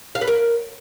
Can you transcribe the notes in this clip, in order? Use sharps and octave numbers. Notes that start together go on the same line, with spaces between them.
F5
B4
A#4